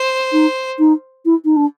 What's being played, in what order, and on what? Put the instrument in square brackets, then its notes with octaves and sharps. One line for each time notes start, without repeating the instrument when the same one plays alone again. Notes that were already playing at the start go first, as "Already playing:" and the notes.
Already playing: [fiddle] C5
[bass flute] D#4
D#4
E4
D#4
D4